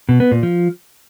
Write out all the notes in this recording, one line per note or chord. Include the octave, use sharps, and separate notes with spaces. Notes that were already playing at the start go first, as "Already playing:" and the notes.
B2
B3
A#2
F3